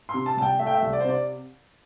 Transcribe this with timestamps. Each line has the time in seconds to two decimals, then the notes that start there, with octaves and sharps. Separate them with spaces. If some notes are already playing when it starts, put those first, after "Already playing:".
0.09 C6
0.14 C3
0.26 A5
0.37 C2 A5
0.42 G5
0.59 A3 E5
0.66 G5
0.74 E5
0.82 C2
0.93 D5
1.00 C5
1.05 C3 D5